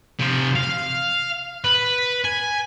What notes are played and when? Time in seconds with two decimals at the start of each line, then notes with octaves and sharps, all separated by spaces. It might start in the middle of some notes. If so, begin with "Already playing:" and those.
0.19 C3 F3
0.55 F5
1.64 B4
2.24 G#5